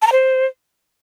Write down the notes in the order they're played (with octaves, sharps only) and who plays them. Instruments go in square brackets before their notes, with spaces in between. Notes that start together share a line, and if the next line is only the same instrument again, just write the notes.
[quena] A5
A#5
C5